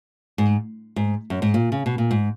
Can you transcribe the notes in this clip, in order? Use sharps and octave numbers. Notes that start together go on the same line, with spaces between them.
G#2
G#2
F#2
G#2
A#2
C#3
B2
A#2
G#2